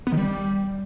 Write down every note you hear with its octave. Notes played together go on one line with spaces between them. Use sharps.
B3
D#3
G3